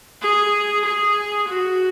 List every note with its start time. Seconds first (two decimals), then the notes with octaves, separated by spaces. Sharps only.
0.22 G#4
0.85 G#4
1.47 F#4